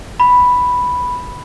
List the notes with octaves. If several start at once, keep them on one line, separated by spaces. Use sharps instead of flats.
B5